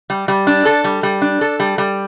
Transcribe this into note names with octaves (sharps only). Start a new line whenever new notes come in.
G3
G3
D4
A4
G3
G3
D4
A4
G3
G3